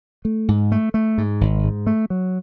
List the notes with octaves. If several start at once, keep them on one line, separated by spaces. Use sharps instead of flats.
A3
G#2
A3
A3
G#2
G#1
G#2
A3
F#3